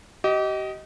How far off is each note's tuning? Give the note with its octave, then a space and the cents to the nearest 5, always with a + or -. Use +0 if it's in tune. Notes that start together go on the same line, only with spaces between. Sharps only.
G4 -35 D#5 +10